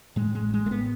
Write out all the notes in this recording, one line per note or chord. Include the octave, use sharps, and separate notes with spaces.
A2 G#3
G#3
A1
G#3
A2 A3
B3